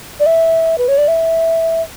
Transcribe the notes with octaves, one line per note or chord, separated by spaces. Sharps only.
D5
E5
B4
C#5
D5
E5